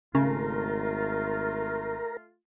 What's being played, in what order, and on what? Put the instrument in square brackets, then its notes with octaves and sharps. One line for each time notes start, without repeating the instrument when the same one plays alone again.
[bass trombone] G#1 [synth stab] C#3 [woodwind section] A3 F4 [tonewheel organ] A#4